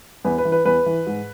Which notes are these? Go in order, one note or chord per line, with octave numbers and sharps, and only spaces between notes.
E2 B4
B4
E3
B4
E2 B4
E3
G#2